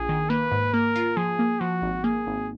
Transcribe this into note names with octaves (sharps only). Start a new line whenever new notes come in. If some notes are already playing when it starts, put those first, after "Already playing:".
Already playing: A#1 G#4
D#3
A#3 B4
G#2
A#3 A#4
F4
F3 G#4
A#3
F3 F#4
G#1
A#3 G#4
G#1